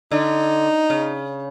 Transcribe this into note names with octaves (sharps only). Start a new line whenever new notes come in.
D3 D#4
C#3